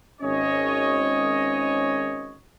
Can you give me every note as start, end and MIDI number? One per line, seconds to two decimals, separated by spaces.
0.21 2.38 32
0.21 2.38 61
0.21 2.38 73
0.21 2.38 75